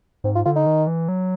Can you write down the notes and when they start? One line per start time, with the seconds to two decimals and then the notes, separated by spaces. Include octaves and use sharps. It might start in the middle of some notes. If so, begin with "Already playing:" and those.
0.24 G#2 C4
0.35 F4
0.45 D3 F4
0.56 D#4
0.66 D#3
0.87 E3
1.08 F#3